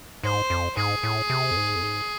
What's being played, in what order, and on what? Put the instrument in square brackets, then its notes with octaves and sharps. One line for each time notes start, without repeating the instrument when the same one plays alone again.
[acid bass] G#2 [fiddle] C5
[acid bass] F2
[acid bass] G#2 [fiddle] G#4
[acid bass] A2
C3
F2
G#2
F2
G#2